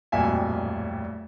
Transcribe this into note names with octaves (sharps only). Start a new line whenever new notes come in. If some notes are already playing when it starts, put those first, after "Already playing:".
D1 F2 A#2 G3 E5 G#5